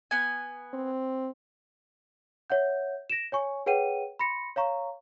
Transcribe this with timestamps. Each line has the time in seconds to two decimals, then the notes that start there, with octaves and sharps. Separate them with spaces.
0.11 B3 G#5
0.74 C4
2.50 C#5 E5 F#5 G6
3.10 A#6 D7 E7
3.32 C#5 G#5 C#6
3.66 G#4 B4 C#5 F#5 G5 D#7
4.19 B5 C6 A#6 C#7
4.56 C#5 F5 A#5 C#6